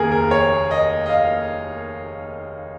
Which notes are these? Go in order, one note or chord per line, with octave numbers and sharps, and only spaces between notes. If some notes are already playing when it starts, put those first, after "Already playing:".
Already playing: F1 D#2 C#3 A#3 G#4 A#4
A#4
C#5
D#5
D#5
F5